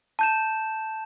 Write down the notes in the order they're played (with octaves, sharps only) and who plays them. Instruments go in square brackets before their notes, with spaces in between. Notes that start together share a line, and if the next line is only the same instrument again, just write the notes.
[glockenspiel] A5 G6 E7